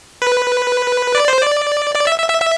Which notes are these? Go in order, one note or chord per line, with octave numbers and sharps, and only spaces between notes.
B4
D5
C5
D5
D5
E5
E5
E5
E5